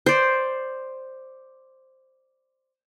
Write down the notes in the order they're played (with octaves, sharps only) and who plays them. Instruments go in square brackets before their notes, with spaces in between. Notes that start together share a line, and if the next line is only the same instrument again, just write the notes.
[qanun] C5 D5